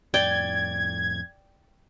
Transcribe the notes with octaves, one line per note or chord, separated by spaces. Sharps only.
F2 A2 D5 G5 G#6